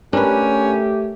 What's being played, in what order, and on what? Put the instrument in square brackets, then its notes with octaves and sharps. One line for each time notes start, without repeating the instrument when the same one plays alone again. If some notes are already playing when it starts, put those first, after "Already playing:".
[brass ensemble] A3 G4 [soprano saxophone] C#4 [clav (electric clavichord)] D4 B4 [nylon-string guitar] A#4